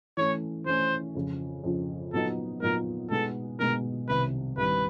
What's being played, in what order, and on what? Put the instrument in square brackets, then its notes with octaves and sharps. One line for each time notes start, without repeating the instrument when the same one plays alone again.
[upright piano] E3 A3 C#4 [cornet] C#5
[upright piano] E3 A3 C#4 [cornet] C5
[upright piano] F2 C#3 F3
F2 C#3 F3
[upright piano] A#2 F#3 B3 D#4 [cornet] A4
[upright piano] A#2 F#3 B3 D#4 [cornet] A#4
[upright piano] B2 G#3 B3 D#4 [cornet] A4
[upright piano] B2 G#3 B3 D#4 [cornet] A#4
[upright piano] C2 C3 D#3 G3 [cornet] B4
[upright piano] C2 C3 D#3 G3 [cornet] B4